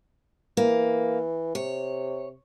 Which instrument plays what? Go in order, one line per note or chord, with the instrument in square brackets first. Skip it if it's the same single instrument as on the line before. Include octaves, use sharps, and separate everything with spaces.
[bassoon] E3 [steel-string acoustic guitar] A#3
[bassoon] C3 [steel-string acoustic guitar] C#5